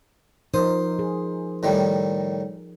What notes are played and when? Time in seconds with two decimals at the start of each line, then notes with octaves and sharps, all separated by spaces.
0.54 F3 D#4 A#4 C5 D#6
0.99 G#4
1.63 A2 D#3 G3